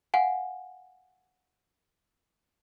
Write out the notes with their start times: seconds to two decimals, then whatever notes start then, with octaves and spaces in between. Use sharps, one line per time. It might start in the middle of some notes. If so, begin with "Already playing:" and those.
0.14 F5 F#5 G#5